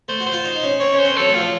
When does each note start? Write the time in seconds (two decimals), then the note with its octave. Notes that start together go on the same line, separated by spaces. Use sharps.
0.08 A3 C5
0.20 F#4
0.26 C5
0.32 F4
0.44 D#4
0.55 D#4
0.63 C#4
0.80 C4 C#5
0.93 C#4
0.99 C5
1.05 C4
1.17 F#3 A4
1.28 A3
1.34 F#3 F4
1.40 F3